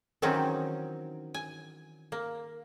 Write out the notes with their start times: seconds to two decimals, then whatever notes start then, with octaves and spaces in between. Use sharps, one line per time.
0.22 D#3 E3 F#3 C4 C#4 D#4
1.34 G#5
2.12 A#3